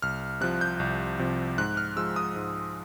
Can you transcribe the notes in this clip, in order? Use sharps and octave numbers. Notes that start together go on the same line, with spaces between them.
C2 F6
C3 F3 F#6
G6
C2
C3 F3
G#2 F#6
F6
F3 G#3 E6
D#6
G#2